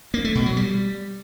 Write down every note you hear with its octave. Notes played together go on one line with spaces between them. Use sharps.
A#3
A3
B2
F#3
G3